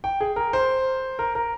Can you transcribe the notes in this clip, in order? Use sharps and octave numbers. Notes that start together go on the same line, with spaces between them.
G5
G#4
A#4
C5
A#4
A#4